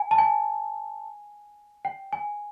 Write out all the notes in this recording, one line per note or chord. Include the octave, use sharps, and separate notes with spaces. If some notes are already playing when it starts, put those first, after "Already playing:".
Already playing: G#5
A5
G#5
G5
G#5